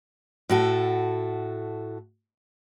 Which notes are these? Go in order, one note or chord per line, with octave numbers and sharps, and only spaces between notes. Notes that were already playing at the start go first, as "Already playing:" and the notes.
A2 F#4 A4